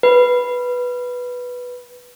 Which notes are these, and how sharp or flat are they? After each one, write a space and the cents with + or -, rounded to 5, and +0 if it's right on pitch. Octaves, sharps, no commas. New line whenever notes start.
B4 -5